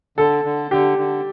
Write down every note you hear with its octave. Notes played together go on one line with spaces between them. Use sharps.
D3 A4
D3
D3 G4
D3